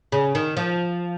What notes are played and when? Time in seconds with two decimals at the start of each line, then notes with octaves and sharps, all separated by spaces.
0.12 C#3
0.35 D#3
0.57 F3